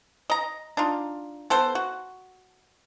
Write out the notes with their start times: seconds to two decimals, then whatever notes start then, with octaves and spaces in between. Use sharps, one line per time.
0.30 D#5 A#5
0.77 D4 D#4 F4
1.50 B3 A4 C5
1.75 F#4